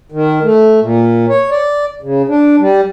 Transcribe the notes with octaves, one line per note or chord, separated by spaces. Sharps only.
D#3
A3
A#2
C#5
D5
C#3
D4
G3